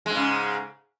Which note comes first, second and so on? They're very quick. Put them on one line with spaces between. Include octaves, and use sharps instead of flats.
G#3 G#2 C#3